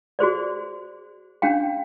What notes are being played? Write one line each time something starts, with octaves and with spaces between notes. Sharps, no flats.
F#4 G#4 C5 D5
C#4 D4 F5 G5